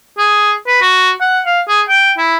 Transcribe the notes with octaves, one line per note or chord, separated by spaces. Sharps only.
G#4
B4
F#4
F#5
F5
G#4
G5
E4